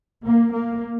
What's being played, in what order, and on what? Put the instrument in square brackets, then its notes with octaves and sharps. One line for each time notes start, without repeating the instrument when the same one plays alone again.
[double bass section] A#3
A#3